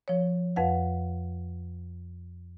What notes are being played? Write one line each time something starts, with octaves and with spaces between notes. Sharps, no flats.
F3 C#5
F2 B4 F5 F#5